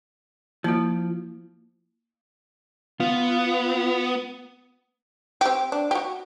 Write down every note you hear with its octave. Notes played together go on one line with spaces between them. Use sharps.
F3 A#3 E4
B3 F4
C4 G4
D4
F#4 G4